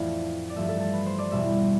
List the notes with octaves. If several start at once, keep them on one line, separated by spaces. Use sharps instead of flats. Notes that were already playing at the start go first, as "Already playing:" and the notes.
Already playing: F2 A2 E3 A3 D5 F5
D5
G2 F3 A3 E5
A4
A4
B4
C5
D5
E2 B2 G3 E5